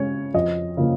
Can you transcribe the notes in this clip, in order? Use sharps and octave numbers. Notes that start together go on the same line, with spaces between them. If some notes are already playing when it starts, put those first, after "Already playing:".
Already playing: C#3 G#3 C#4 C#5
F2 D#5
C#3 F3 A#3